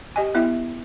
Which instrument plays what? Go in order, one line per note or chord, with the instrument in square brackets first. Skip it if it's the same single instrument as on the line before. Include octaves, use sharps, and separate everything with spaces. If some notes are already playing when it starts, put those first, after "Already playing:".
[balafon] G4 D#5 G#5
B3 E4 E5